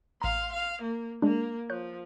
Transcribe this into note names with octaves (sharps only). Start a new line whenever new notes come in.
A1 F5 A#5 C6
F5
A#3
G#3 A#3 D4
F3 C#5 F#6 G6